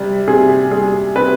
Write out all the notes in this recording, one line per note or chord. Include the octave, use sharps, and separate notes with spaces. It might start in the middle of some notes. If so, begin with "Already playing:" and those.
Already playing: C3 G3
C3 G#4
G3 G#4
C3 B4